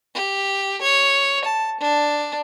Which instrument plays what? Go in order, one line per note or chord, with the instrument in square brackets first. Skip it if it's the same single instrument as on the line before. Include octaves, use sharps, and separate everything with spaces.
[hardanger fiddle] G4
C#5
A5
D4